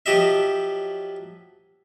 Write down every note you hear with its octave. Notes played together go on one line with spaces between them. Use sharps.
F3 F#3 G4 D#5 E5